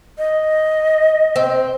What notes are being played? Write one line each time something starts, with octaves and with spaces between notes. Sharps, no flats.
D#5
C4